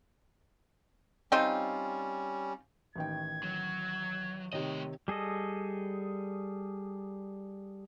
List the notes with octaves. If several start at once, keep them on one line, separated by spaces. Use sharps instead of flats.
G3 C4 C#4 D#4 F4
A1 D#3 G5 G#6
F#3
C3 D#3 A3 C#5 D#5
G3 G#4 A4 D#5